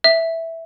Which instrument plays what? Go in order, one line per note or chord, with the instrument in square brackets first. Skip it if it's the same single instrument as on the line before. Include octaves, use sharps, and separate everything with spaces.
[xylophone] E5